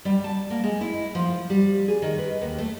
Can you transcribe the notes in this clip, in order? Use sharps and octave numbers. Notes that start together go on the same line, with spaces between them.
G3
A5
A#3
G#3
E4
F3
G3
G#4
D#3
B4
D#2
A3